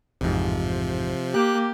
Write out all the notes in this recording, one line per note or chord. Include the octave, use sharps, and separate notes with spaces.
A1 F2 G#2 C3 F3
A#3 G4 F#6